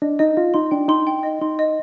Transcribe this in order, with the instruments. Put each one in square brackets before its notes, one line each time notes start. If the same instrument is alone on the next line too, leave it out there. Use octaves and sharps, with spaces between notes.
[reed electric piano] D4 [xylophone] D#5
[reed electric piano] D#4 [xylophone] D#5
[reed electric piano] F4 [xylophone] D#5
[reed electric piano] D#4 [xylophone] C6
[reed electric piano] D4 [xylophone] G5
[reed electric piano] D#4 [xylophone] C6
[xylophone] G5
D#5
[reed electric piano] D#4 [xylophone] C6
[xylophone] D#5